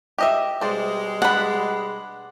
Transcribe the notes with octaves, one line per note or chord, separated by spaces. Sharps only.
G4 D#5 E5
B2 G3 G#3 C5 D5
D4 F#5 B5